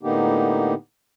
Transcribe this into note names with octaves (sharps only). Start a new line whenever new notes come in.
A2 D3 A#3 B3 D#4 G4